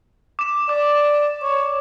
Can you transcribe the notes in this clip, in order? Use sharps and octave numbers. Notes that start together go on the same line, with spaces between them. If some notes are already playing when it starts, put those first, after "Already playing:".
D6 E7
D5 D6
C#5